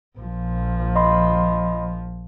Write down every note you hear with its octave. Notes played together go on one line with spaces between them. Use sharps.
A#1 F3
D#5 B5 C6